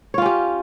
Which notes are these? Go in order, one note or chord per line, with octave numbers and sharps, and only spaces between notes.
C#4 F4 G4 C#5